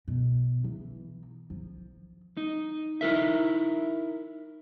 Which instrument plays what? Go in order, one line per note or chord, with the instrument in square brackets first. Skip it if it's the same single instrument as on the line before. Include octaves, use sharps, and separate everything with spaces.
[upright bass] B2
E3
F3
[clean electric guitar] D#4
D#4 E4 A#4 E5